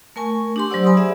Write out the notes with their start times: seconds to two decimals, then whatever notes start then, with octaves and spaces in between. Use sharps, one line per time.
0.16 A3 A#4 G#5 C#6
0.56 D4 G4 C6
0.70 F#3 G4 C5 D5 F#5 E6
0.85 G#5 B5 C6 D#6
0.97 G#4 D5 E5 F#5 E6